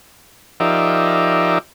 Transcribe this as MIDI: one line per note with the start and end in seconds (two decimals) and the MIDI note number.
0.60 1.58 53
0.60 1.58 63
0.60 1.58 67
0.60 1.58 70
0.60 1.58 74
0.60 1.58 76